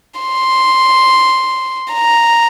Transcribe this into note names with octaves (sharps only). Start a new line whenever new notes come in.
C6
A#5